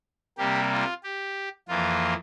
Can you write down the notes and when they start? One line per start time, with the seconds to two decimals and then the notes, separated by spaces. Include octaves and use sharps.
0.38 C3 G3 A#3 G4
0.71 F4
1.04 G4
1.68 F2 E3 A#3 F4